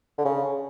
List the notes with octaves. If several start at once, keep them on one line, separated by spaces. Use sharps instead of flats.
D3
C#3